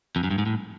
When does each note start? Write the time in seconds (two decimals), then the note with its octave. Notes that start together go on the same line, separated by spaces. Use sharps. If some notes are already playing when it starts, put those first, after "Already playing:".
0.16 F2
0.24 F#2
0.30 G2
0.38 G#2
0.46 A2